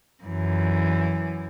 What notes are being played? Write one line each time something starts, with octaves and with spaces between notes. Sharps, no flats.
F#2 E3